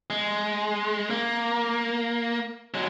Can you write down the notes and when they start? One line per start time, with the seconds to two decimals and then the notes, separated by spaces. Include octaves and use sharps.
0.10 G#3
1.10 A#3
2.74 F#3 G#3